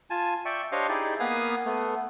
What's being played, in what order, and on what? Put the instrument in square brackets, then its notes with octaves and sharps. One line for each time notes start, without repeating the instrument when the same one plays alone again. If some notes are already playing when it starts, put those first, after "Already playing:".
[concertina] F4 G#5 A5
D5 E5 G5 C#6
D4 G4 C5 C#5 D#5 F5
D#4 E4 G4 G#4 D5
A#3 B3 B4 F5 G#5 D#6
A3 B3